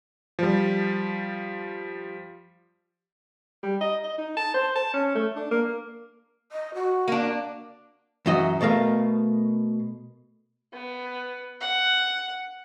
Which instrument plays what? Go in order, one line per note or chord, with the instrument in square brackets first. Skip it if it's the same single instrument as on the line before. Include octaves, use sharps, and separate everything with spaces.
[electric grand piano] F3 G3
[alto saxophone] G3
D#5
D#5
D#4
A5
C5
A5
C#4
A3
D4
A#3
[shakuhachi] D#5
F#4
[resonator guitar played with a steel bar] A#3 D4
[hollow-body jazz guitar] F#2 E3 F#4 D#5
B2 A3 A#4 F5
[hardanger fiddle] B3
F#5